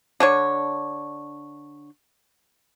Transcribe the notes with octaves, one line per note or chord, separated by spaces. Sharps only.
D3 D4 C#5